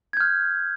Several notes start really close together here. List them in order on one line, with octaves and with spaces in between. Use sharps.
G#6 G6 F6